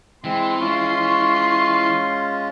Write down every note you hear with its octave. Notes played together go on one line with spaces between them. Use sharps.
E3 G#3 C4 C6
G#3 C#4 F4 C#6